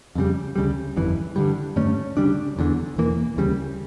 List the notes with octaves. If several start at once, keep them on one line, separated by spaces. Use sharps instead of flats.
F2 C#3 G3
D2 C#3 G3
G1 F2 E3
G2 D3 G3
G2 D3 A3 C#4
D2 C#3 G3 D4
F1 E2 D3
E1 E2 E3 A#3
D2 C#3 G3